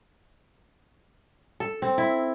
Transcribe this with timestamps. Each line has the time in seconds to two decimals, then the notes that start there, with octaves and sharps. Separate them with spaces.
1.60 A4
1.82 C4
1.98 E4